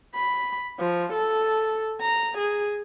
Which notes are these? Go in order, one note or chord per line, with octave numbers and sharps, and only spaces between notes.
B5
F3
A4
A#5
G#4